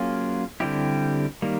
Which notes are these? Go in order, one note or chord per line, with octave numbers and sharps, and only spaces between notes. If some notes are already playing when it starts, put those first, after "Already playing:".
Already playing: F#3 A#3 C#4 F4 G#4
D3 G3 C4 E4 G4
D#3 G3 A#3